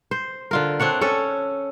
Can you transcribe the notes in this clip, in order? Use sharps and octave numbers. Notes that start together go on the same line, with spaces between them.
C5
D3 F4 A#4
C4 D4 C#5 F#5
C#4 A4 C#5